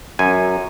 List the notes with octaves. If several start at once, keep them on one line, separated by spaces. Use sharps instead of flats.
F#2 G#5